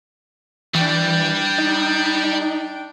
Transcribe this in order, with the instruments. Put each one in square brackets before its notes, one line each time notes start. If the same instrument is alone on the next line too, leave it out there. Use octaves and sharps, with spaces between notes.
[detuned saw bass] E3 [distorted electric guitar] G3 [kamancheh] D4 G5
[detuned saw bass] D#4